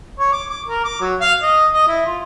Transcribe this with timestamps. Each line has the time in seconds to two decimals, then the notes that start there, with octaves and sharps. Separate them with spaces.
0.19 C#5
0.33 D6
0.50 D6
0.67 A#4
0.84 D6
1.00 F#3
1.20 F5
1.42 D#5
1.73 D#5
1.88 E4
2.05 F4